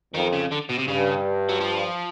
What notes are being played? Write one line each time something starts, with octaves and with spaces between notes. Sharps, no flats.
F2 D#3
C#3
D3
B2
C3
G2 C#3
F#3
F3